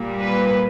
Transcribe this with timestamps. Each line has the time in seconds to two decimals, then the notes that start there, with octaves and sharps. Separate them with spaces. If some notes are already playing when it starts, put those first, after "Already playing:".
Already playing: A#2 G3 A#3
0.20 B4